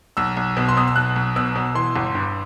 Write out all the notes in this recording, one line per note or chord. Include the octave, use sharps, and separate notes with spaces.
B1 E6
B1
B2
C6
B2 D#6
E6
B1 F#6
B1
B2 E6
B2
E3 C6
G1
G2